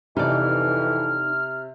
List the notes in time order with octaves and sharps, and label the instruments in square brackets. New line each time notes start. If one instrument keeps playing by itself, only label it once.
[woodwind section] F2 E3 [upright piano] C3 [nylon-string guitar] D#4 D5 [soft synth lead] F6